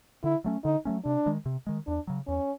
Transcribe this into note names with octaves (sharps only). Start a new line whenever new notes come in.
D3 E4
F#3 A3 C#4
D3 D#4
F#3 A3 C#4
C3 D4
D#3 G#3
C3
D#3 G#3
E2 D4
C#3 F#3
E2 C#4